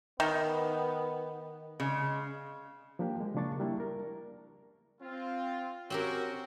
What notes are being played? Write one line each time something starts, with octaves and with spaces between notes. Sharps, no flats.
D#3 B3
C#3 G#3
F3 A#3 D4 G4
G#3
C#3 F3 A#3 D4 C#6 A6
G3 A#3 D4 E4
A#4
C4 F4
C4 C#4 F#4 G4 A#4